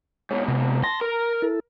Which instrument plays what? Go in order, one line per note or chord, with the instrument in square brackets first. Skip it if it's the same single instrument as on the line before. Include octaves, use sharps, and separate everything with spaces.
[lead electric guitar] G#2 B2 [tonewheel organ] C#5
[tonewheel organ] C3
[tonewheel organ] A5 A#6 [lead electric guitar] C6
[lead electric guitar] A#4 [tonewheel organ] A#5
[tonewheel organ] E4 A4